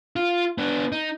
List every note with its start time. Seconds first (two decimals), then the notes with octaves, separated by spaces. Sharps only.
0.16 F4
0.58 B3 D4
0.92 D#4